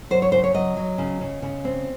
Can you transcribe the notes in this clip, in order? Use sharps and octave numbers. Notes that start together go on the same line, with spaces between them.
F#3 C5
C#5
C#3 C5
C#5
F#3 D#5
F#3
C#3
C#3
C#3
C4